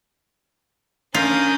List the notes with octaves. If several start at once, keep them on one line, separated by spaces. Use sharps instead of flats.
C#4 D4 F4 A#4 D#6 G6